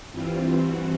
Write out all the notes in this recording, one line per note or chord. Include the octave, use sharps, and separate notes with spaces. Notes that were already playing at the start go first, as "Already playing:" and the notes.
G2 E3 G3 C4 F4
F#4